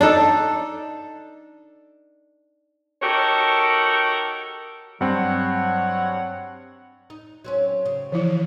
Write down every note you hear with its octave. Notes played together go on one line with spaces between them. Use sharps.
D4 D#4 A4
D#4 F#4 G4 A4 A#4 C#5
G2 F#3 C4 C#5 F#5
D#4
F#3 C4 C#4
C#3
E3 F3 E4